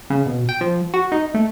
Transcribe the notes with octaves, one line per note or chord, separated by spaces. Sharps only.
C#3
B2
G5
F3
F#4
D#4
A3